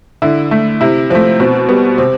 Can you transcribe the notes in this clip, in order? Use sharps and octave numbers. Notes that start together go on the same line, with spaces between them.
D3 E4
A3
C3 E4
F3 A3 C4
B2 C4
G3 B3
C3 C4